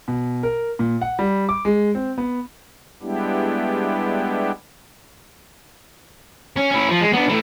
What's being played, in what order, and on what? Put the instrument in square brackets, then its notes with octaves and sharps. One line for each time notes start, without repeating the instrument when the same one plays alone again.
[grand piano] B2
A#4
A#2
F#5
G3
D6
G#3
C4
B3
[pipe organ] G3 G#3 B3 D4 E4 G4
[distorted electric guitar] C#4
C#4 E4
F3
G#3
B3 D4
E3 A3